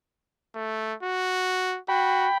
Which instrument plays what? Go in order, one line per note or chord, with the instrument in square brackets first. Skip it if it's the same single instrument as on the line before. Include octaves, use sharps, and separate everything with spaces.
[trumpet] A3
F#4
[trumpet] F#4 [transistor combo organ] G5 B5